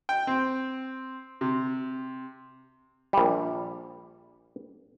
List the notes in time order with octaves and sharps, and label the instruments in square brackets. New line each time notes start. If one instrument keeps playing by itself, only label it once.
[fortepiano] G5
C4
C3
[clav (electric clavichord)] A#1 G3